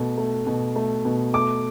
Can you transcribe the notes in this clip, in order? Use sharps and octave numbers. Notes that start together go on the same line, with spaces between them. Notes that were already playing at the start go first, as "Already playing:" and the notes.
Already playing: B2 A3
A3
B2
A3
B2
A3 D6